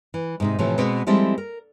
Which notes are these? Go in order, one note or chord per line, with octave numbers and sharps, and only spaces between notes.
E3
G#2 C3 D#4
A2 C3 E3 F3 A3
B2 G#3 B3 C4
F3 G3 G#3 C4 E4 A4
A#4